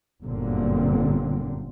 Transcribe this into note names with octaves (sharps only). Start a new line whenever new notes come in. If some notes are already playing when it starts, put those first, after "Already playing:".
G1 F#2 A#2 D3 C4